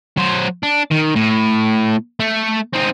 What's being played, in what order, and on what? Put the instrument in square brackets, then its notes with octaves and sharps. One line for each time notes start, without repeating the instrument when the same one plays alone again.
[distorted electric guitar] F#3 C5
D4
D#3
A2
A3
C4 D#4